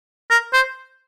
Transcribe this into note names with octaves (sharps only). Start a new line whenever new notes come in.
A#4
C5